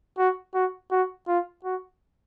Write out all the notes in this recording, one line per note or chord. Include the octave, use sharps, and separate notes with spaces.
F#4
F#4
F#4
F4
F#4